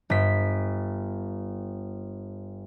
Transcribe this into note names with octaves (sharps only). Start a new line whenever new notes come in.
G1 B6